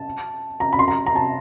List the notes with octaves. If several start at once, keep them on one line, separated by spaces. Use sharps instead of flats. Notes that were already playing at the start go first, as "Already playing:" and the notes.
Already playing: A5
A#5
B5
C6
A#5
A#5
A5